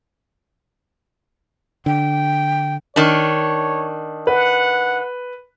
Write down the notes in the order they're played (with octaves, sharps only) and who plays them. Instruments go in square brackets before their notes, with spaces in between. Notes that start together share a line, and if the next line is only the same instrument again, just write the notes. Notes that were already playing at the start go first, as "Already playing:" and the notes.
[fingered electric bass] D3 [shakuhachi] G5
[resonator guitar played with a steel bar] D#3 D4 [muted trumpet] C#5
[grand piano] B4 [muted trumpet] F#5